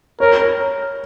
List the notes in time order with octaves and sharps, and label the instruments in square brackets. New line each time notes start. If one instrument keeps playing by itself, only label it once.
[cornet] A#4 [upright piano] C#5